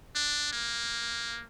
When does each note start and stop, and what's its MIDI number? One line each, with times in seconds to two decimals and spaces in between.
0.15 0.52 62
0.52 1.44 58